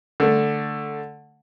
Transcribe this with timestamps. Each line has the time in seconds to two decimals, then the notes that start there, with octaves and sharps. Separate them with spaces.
0.20 D3 A3